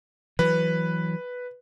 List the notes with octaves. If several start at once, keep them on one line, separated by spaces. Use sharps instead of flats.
E3 F#3 B4